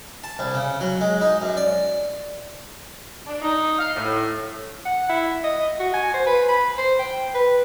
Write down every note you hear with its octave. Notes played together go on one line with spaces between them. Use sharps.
A5
C2
C#3
F#3
G#3
D#4
F#2
D5
D4
D#4
F5
A2
F#5
E4
D#5
F#4
G#5
C5
B4
B5
C5
G5
B4